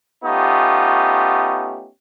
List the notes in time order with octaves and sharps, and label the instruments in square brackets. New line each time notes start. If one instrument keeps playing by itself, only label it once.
[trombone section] A3 B3 C#4 D#4 F4 G4